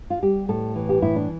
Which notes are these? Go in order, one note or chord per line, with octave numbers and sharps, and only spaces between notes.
F4
G3 G4
A2 A4
E3
G4
A2 E4
D4